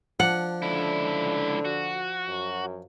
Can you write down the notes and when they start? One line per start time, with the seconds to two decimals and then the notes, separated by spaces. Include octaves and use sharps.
0.20 F3 D4 F#5
0.62 C#2 D3 E4
1.65 F#4
2.28 F#2